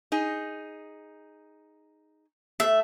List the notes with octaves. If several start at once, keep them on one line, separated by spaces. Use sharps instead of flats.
D#4 G#4
A3 E5